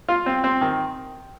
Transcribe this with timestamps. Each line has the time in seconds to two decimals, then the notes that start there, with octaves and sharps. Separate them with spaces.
0.08 F4
0.26 C4
0.44 C4
0.61 D#3